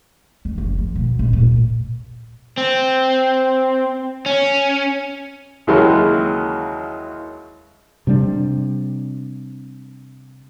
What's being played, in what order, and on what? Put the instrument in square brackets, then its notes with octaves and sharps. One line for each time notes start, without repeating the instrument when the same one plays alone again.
[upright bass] F2
F#1
F3
B2
A#1
A#2
[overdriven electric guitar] C4
C#4
[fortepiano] D#2 C#3 E3 F#3 G#3 A#3
[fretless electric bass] C3 G3 B3 D4